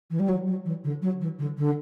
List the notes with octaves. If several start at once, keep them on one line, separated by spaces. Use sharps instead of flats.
E3
G3
F#3
F#3
E3
D3
F#3
E3
D3
D3